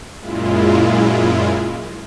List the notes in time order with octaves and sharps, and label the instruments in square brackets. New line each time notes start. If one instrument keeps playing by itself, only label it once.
[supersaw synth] F#2 A#2 G#3 E4 F4